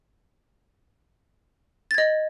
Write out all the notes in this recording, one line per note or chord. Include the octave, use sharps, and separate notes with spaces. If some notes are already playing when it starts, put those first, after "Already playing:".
D#5 G#6 A6